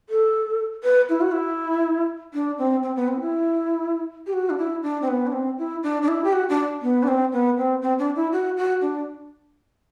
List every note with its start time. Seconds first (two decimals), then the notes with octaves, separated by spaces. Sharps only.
0.09 A4
0.84 B4
1.09 E4
1.21 F#4
1.32 E4
2.34 D4
2.58 C4
2.83 C4
2.96 B3
3.08 C4
3.20 E4
4.26 G4
4.33 F#4
4.50 D4
4.58 E4
4.83 D4
5.02 C4
5.08 B3
5.27 D4
5.32 C4
5.58 E4
5.83 D4
6.02 D4
6.08 E4
6.24 G4
6.33 F#4
6.49 D4
6.82 B3
7.03 D4
7.08 C4
7.33 B3
7.57 C4
7.82 C4
7.98 D4
8.16 E4
8.32 F#4
8.57 F#4
8.81 D4